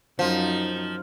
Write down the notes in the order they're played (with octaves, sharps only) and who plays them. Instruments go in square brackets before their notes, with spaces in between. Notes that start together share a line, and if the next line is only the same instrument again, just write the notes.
[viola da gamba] F#2 D#4 [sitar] F3